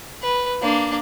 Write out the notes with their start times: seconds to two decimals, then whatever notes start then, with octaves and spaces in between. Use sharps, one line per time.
0.22 B4
0.62 A#3 D4